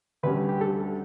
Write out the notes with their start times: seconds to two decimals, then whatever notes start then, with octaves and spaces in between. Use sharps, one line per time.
0.23 D2 D3 G3 C#4 B4
0.49 G4
0.61 A4